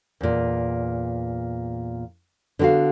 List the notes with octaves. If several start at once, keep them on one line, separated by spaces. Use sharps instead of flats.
E2 A#2
D3 B3 E4 F#4 F5